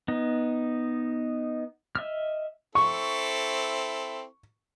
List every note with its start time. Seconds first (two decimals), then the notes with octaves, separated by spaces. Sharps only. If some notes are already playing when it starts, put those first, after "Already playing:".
0.08 B3 D#4
1.95 D#5 E5 E6 F6
2.75 C4 E4 A4 C#6